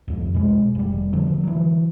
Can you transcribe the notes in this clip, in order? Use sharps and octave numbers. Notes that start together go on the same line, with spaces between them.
C2 F2
B2 G#3
F1 G3
D3 F3 F#3
E3 F#3